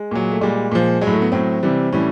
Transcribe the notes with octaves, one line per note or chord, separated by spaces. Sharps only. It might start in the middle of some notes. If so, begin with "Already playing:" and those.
Already playing: G#3
A#2 F#3
A3
A#2 G3 G#3
A#2 F3
F#3 G#3
A2
A3
B3
A2 F#3 C4
C3 E3 G3
A2 E3 G3 C#4